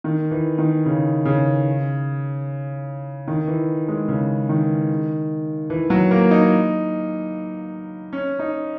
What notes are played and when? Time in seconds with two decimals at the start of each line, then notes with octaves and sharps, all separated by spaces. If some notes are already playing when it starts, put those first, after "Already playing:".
0.04 D#3
0.31 E3
0.58 D#3
0.86 C#3
1.25 C#3
3.28 D#3
3.48 E3
3.88 G#3
4.08 C#3
4.49 D#3
5.70 E3
5.90 F#3
6.11 A#3
6.31 D#4
8.13 C#4
8.39 D#4